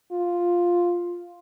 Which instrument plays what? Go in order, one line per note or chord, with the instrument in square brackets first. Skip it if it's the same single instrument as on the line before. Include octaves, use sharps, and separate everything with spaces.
[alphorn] F4